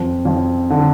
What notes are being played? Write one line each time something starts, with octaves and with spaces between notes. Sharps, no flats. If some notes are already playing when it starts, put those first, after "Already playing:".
Already playing: F2
F2
D3